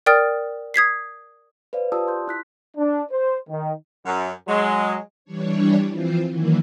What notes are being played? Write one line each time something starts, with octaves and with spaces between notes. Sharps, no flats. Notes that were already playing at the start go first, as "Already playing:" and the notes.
A#4 D5 G5 D#6 F6 A6
D#6 G#6 B6 C7
B4 C5 D5 F5
F4 G4 D5 A5 D#6 E6
C6 G6
E4 F#6 B6
D4
C5
D#3
F#2
F#3 G#3
E3 G3 D4 C#5
E3 F3 C4 F4 C5
D#3 E3 F#3 A#3 E4